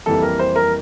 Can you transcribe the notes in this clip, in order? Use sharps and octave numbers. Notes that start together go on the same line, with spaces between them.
F2 E3 G3 A#3 A4
A#4
C5
A#4